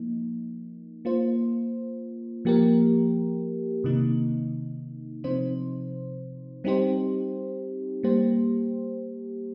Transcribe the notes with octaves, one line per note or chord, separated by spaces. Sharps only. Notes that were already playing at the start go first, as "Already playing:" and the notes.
Already playing: F3 A#3 D#4
A#3 F4 C5
F3 A#3 G4 A#4
C3 D#3 A#3 D#4
C3 F3 C4 D#4 C5
G3 C4 D#4 G4 C5
G3 A#3 G4 C5